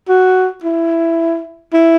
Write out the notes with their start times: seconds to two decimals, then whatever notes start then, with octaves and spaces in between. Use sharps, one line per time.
0.09 F#4
0.64 E4
1.74 E4